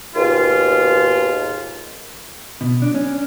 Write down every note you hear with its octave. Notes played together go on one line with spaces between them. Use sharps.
D#2 G#2 B2 F4
B2
D4
C#4